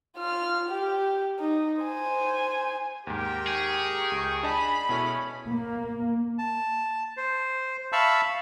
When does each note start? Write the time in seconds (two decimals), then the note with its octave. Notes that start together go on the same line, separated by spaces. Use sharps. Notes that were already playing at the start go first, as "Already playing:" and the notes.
0.17 F4 F6
0.69 G4
1.39 D#4
1.82 C5 G#5
3.07 D#2 G#2 G4 A#4 G5
3.47 G#4 C#6
4.11 C#2
4.43 D4 D#5 A5 B5
4.89 B2 G#3 C#4 E4 A4
5.50 A#3
6.39 A5
7.17 C5
7.92 E5 F5 A5 B5 C#6 E6